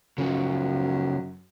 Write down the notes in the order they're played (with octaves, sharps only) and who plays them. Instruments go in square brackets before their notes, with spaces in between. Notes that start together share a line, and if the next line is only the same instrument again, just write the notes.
[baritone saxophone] F#2 [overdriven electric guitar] C#3 F3